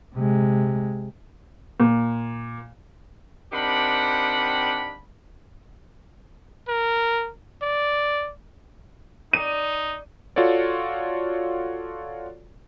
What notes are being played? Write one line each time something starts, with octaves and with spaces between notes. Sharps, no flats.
C3 G#3
A#2
D#3 C4 D4 G4 F#5 B5
A#4
D5
D#4 D5 D#7
F4 F#4 A4 C#5 D5